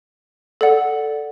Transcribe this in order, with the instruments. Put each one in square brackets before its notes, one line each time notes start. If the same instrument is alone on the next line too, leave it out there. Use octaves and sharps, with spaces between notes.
[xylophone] A4 D5 F#5